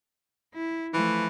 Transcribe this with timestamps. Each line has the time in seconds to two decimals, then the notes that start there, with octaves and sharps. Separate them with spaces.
0.54 E4
0.94 E3 F3 A3